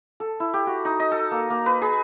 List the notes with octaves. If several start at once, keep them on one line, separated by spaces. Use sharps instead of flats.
A4
E4
G4
F#4
D#4
D#5
A4
A#3
A#3
B4
G#4